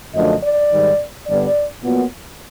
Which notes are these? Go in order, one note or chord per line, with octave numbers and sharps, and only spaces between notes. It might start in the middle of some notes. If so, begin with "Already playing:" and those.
F#2 D3 F3 A3 D4 D#5
D5
G#2 D#3 G3
G2 D3 G3 B3 D5
A#2 F#3 B3